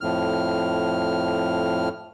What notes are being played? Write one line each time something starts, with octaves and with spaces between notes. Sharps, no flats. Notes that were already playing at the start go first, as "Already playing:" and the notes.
F2 A2 F6